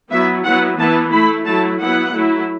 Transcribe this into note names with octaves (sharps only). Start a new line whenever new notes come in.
F#3 B3 E4 E5
F#3 B3 E4 F#5
E3 B3 E4 A5
A3 E4 B5
F#3 A3 E4 A5
F#3 B3 E4 F#5
F#3 A3 E4